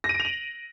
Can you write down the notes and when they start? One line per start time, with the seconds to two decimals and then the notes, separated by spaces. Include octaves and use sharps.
0.04 A#6
0.09 D#7
0.14 D7
0.20 F7
0.25 F#7